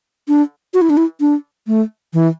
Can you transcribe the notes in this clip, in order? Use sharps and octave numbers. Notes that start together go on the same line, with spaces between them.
D4
F#4
E4
D4
E4
D4
A3
E3